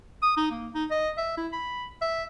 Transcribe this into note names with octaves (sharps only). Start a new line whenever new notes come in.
D#6
D#4
A#3
D#4
D#5
E5
E4
B5
E5